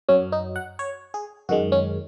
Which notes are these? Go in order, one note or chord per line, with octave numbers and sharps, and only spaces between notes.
F#2 F#3 C#4
D#4
F#5
C#5
G#4
F#2 D#3 G#3 F#4
C#4